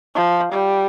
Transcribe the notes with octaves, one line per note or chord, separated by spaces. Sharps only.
F3
G3